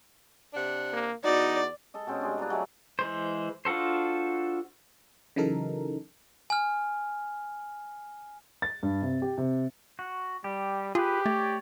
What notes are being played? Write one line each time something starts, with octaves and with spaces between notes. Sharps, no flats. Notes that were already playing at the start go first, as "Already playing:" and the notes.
C3 D4 F#5
A#3
E2 D#4 F#4 D5
G#3 A4 D#5
B2 G#3 C4 C#4
G3 G#3 D4
D4 F4 B4 A#5
F#3 G#3 A3
E3 G#3 C5
D4 F4 F#4 A4 C5
C#3 E3 F#3 D#4 A4 A#4
G#5 F6
A6
G2
C3
G4
C3
F#4
G3 G4
F4 G4 G#4 B4
A3 C#5 D5